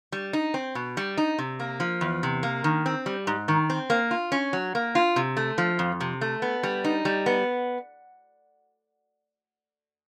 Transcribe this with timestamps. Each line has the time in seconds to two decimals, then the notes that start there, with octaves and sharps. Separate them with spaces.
0.12 G3
0.33 D#4
0.54 C4
0.75 B2
0.97 G3
1.17 D#4
1.39 C3
1.60 A#3
1.80 F3
2.01 E2
2.23 C3
2.43 A#3
2.64 D#3
2.86 C4
3.06 G3
3.27 G#2
3.48 D#3
3.70 C4
3.90 A#3
4.11 F4
4.32 C#4
4.53 F#3
4.75 A#3
4.95 F4
5.16 C3
5.37 A3
5.58 F3
5.79 F2
6.01 C3
6.21 A3
6.42 B3
6.63 G3
6.84 D#4
7.05 G3
7.26 B3